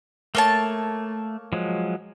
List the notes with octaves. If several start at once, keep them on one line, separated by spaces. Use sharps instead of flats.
A3 A#3 C#5 A5
F3 F#3 G#3